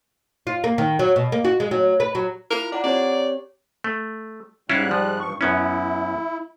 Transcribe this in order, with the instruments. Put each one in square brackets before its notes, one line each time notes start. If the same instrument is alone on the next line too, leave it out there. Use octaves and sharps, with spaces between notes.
[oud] F4
A#3
D#3
F#3
B2
A#3
F#4
G#3
F#3
B4
F#3
[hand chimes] E4 F4 [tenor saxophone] A#4
[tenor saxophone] D4 [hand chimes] D5 F#5 A#5
[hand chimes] C4 G4 C#5 [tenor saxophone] D5
[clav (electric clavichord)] A3
[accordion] G#2 G3 F#6 [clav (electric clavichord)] C#4 E4 F4
[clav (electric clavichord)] F3
[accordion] G2 C#6
[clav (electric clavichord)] F#2 B3 C#4 [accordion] E4